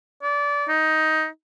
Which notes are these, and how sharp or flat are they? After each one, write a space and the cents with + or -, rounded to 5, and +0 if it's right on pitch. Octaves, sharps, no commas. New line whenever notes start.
D5 -25
D#4 +10